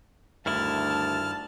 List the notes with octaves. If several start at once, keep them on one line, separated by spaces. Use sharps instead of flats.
D2 G2 D#3 E4 A5 F6